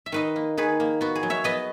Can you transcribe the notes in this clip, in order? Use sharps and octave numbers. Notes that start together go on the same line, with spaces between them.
E5
D#3 B4 D#5
A#3
D#3 G#4 B4
A#3
B3 F#4
G#4
F#3
C#5 E5
B3 B4 D#5